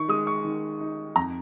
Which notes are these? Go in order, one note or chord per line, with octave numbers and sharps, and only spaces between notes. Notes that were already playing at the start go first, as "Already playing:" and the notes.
Already playing: D#3 C#6
G#3 D#6
C#6
D#3
D#4
F2 A#5